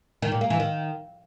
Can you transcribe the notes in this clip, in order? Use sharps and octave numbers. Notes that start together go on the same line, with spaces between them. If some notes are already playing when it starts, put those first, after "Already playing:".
D#3
A#2
A#3
E3
D#3